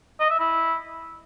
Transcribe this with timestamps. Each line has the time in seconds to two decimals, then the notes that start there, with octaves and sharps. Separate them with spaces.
0.20 D#5
0.30 E5
0.39 E4